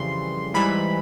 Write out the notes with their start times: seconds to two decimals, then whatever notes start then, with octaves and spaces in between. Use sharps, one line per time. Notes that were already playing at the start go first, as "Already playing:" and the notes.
Already playing: F2 C#3 E3 G3 C6
0.54 G#2 E3 G3 B5